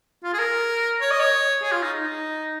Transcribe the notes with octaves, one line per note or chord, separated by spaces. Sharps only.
F4
G#4
A#4
C#5
D#5
C#5
G#4
F4
D#4
D#4